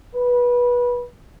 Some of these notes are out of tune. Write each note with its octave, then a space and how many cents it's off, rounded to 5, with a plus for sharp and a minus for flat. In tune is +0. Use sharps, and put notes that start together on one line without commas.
B4 -20